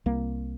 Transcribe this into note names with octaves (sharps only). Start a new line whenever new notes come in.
C2 A#3